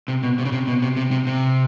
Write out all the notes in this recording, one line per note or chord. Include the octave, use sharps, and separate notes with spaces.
C3
B2
C3
C#3
C3
B2
C3
C3
C3
C3